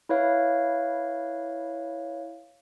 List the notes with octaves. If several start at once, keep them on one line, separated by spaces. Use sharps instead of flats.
E4 B4 C#5 F5